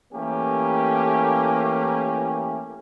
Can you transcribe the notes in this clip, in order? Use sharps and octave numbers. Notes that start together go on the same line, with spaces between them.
E3 A3 A#3 C#4 G4 A#4